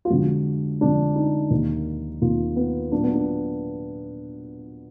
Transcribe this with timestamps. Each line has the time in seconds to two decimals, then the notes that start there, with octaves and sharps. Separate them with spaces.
0.05 F4
0.10 F2 D3 G#3 F#4
0.80 F2 D3 G#3 D4
1.16 D#4
1.51 D#2 D#3 A#3
2.22 D#2 D#3 A#3 F4
2.56 B3
2.92 A#2 F#3 A#3 D4
3.03 B3
3.14 D4